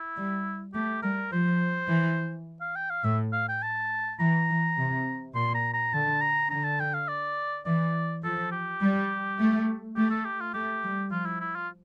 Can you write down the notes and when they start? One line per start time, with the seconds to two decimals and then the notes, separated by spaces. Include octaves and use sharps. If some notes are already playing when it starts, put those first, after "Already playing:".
Already playing: E4
0.17 G3
0.74 A3 G4
1.03 G3 A#4
1.32 F3 C5
1.89 E3
2.61 F5
2.76 G5
2.90 F5
3.04 A2 E5
3.33 F5
3.49 G5
3.62 A5
4.19 E3 A#5
4.49 E3
4.77 C3
5.35 A#2 C6
5.55 A#5
5.74 A#5
5.93 D3 A5
6.21 A#5
6.50 D3 A#5
6.64 A5
6.80 G5
6.94 F5
7.08 D5
7.66 E3 D5
8.24 F3 A4
8.52 G4
8.82 G3
9.39 A3
9.96 A3 G4
10.10 A4
10.25 G4
10.40 F4
10.54 A3 G4
10.84 G3
11.11 F3 F4
11.26 E4
11.40 E4
11.56 F4